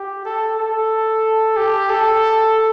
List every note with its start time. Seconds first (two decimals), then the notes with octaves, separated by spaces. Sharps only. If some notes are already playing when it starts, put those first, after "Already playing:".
Already playing: G4
0.25 A4
0.58 A4
1.57 G4
1.90 A4